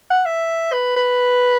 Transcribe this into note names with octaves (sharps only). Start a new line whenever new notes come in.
F#5
E5
B4
B4